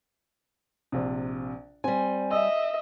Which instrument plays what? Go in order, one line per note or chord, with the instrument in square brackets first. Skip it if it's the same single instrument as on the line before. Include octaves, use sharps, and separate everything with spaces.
[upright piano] A#1 C3
[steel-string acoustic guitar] G3 G#5 [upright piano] C4
[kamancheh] D#5 E5 [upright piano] E6